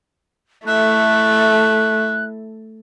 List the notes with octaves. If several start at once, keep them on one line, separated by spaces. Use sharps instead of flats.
A3 E4 A4 E5 F#6